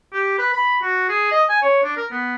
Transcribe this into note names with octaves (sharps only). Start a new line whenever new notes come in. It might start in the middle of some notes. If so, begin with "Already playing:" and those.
G4
B4
B5
F#4
G#4
D#5
G#5
C#5
D4
A#4
B3